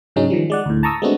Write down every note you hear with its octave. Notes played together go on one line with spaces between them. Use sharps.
G#2 C#3 F#3 G#3 C#4 D#4
D#3 F3 G3
G#3 D5 F#5
D2 A2
A5 A#5 C#6 D#6 E6
G#3 A3 B3 C4 D4 F#4